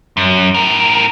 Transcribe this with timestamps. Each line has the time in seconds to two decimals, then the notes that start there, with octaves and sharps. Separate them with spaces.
0.17 F#2
0.54 A2 A#4